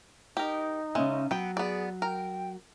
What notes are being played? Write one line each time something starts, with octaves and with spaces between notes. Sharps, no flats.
D#4 G4 A#4
C#3 G#3 C#4 E5
F#3 B3 G5
B3 G#4 D5
A#4 G5